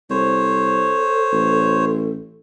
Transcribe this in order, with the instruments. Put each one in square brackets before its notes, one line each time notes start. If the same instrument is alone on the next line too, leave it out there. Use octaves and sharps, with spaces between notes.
[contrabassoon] C2 [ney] A4 [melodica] C5 C#5
[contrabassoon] A1